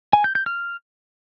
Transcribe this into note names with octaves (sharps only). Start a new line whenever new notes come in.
G#5
G6
G6
F6